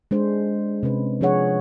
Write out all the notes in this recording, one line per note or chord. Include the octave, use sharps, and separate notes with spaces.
G#3 D4 C5
C3 C#4 B4
F3 D4 G#4 C#5 F#5